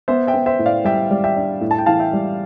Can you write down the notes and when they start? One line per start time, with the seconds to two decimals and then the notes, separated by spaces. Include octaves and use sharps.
0.08 B3 C5 E5
0.27 E5 G5
0.34 B3
0.46 C5 E5
0.59 A2
0.66 D5 F5
0.84 G3 E5 G5
1.11 G3
1.24 E5 G5
1.37 D4
1.61 A2
1.71 A5
1.78 G5
1.86 E3 F5 A5
1.99 E5 G5
2.13 G3